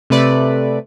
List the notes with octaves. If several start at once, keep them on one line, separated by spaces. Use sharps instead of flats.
C3 A3 B4 D5